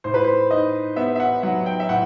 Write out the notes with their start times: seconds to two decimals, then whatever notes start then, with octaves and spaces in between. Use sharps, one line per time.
0.04 A2 C5
0.14 B4
0.24 C5
0.51 D#4 D#5
0.96 B3 E5
1.15 E5
1.20 F#5
1.43 F#3 F#5
1.66 G5
1.80 E5
1.89 A2 F#5